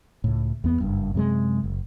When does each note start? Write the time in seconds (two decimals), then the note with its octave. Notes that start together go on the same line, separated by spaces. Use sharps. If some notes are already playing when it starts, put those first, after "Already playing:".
0.24 C#2 A2
0.64 E2 B3
0.80 F#1 G2
1.14 F#2 C3 G3 G#3
1.64 F#1